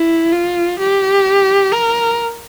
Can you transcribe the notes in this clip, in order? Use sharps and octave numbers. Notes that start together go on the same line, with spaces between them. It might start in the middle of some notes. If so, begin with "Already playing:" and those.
Already playing: E4
F4
G4
A#4